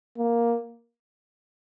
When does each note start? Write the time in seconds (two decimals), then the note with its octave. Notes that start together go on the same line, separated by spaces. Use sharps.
0.18 A#3